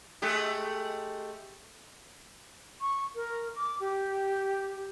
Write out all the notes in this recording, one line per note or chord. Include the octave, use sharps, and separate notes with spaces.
G#3 A3 G4
C#6
A#4
D6
G4